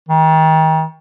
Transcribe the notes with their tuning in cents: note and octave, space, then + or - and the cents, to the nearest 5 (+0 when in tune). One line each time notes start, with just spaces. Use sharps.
D#3 +30